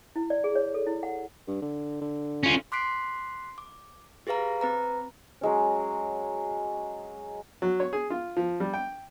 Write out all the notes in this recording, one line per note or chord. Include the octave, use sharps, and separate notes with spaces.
E4
D5
G#4
C#5
A4
E4
F#5
G2
D3
D3
C#4 F4
C6 D6 F#6 B6 C7 D7
D6
G4 G#4 B4 F5 A#5
C4 B4 A#5
F#3 G#3 C#4
F#3
C#5
G#4
F4
F3
G3
G5